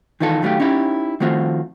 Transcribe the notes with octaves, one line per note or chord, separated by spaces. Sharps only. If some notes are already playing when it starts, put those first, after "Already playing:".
D#3 E3 D#4 F4 A4
D#3 F#3 A3 C#4 F4 G4
C#4 D#4 E4 G4
D#3 F3 A3 C4 F4 F#4